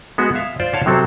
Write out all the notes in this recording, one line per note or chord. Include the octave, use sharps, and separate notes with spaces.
G#3 B3 F#4
E5 F5
F4 C5 D5
C5 C#5 F5 F#5 A5
C3 F#3 C4 A4